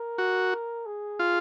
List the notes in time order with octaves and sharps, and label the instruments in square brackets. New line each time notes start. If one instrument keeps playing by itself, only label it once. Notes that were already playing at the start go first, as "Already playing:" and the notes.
Already playing: [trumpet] A#4
[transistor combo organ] F#4
[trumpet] G#4
[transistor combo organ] F4